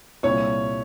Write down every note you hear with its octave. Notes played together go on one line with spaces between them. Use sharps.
C2 A#2 C#5 C#6